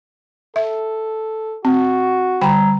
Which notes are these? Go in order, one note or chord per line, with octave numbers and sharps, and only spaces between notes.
A4 E5
C4 F#4
D3 G3 G5 A#5 B5